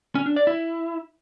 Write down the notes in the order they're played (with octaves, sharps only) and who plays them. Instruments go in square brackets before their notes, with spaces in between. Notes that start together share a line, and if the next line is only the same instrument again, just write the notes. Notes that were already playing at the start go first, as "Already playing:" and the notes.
[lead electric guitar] C#4
D4
D5
E4